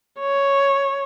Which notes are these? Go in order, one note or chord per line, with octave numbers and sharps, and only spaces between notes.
C#5